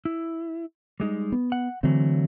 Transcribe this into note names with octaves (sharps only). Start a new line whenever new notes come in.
E4
G3 G#3 D#4
B3
F#5
D3 E3 F#3 A3 C4